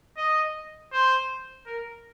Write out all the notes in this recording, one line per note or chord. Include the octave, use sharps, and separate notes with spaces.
D#5
C5
A#4